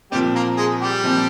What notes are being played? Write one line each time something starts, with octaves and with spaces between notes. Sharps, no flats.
A#2 F3 G3 C4 G4
A#3 A#4
G#3 G#4
G3 G4
A#2 F3 C4